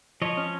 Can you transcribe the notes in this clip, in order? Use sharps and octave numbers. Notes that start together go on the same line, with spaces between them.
F3 C#5 D#5
C#4